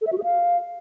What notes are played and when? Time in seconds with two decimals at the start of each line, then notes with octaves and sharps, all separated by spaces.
0.01 A4
0.07 E5
0.12 F#4
0.18 G#4
0.23 F5